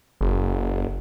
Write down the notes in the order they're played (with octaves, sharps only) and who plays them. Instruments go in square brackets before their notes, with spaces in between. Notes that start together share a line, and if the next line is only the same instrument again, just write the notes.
[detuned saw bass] F#1